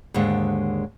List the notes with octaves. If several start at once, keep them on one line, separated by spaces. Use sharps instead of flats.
D#2 G#2 D3 G#3